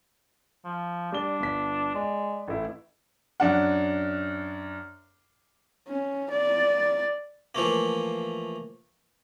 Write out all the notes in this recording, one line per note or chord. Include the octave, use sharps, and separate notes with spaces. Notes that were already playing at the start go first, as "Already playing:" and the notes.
F3
G3 D4 D5 G7
G1 B6
G#3 D5
A1 A3 E4
F#2 D4 F#5
C#4
D5
E3 F3 A3 A#3